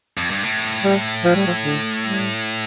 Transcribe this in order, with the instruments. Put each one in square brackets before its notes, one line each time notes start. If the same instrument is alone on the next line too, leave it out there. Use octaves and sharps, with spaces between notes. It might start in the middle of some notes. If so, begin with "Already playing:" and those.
[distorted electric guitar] F2
G2
A2
[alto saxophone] G3
F3
G3
F3
D3
G3